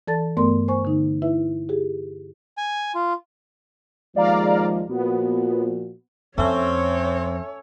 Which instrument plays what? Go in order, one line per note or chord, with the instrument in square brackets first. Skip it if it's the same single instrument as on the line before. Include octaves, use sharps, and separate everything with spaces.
[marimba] E3 A4 D5 A5 A6
G2 A3 B3 A#4 D5 C6
C5 G#5 C#6
D3 D#4
E4 B4 E5
G4 G#4
[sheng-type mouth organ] G#5
F4
[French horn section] D#2 F3 G#3 [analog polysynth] D5 F5 A#5
[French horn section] A#2 F3 F#4 [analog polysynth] B3
[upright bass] F2 [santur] A3 C#4 [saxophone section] C4 [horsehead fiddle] C#5